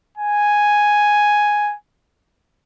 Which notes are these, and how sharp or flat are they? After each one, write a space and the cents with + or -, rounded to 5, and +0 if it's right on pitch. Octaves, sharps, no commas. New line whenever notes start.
G#5 +0